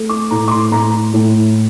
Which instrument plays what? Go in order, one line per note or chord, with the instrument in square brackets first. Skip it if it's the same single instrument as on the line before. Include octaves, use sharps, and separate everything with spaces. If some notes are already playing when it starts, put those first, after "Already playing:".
Already playing: [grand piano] A3
D6
A2 A#5
D6
C6
A2 A#5
A2